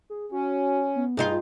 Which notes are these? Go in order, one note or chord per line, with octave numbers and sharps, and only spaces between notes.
G#4
C#4 F#4
B3
G2 D#4 F4 G#4